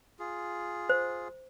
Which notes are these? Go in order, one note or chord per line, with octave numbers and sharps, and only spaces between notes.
F4 G#4
C5